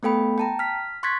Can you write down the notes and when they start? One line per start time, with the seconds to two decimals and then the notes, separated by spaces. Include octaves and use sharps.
0.03 A3 B3 A4 G5 B5
0.38 G5 A5 A#5
0.59 F6 B6
1.03 C6 C#6 F#6 G#6 A6 B6